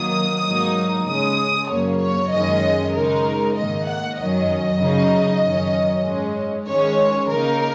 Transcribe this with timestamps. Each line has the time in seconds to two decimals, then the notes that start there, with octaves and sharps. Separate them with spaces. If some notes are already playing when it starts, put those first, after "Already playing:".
Already playing: D#3 F#3 A#3 D#6
0.45 G#2 F#3 A#3 D#4
1.08 C#3 G#3 C#4 D#6
1.70 F#2 C#3 F#3 A#3 C#5
2.01 C#5
2.32 F#2 D#3 G#3 C#4 D#5
2.95 C#3 G#3 D#4 A#4
3.57 G#2 D#3 A#3 D#5
3.88 F#5
4.18 F#2 D#3 F#3 C#4 D#5
4.81 C#3 F#3 D#4
5.43 F#2 D#3 F#3 C#4
6.05 G#2 G#3 C#4
6.68 D#3 G#3 C#4 C#5
7.29 C#3 A#3 D#4 A#4